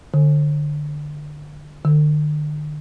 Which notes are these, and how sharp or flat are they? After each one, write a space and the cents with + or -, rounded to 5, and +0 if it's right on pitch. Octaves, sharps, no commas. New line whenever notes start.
D3 +15
D3 +40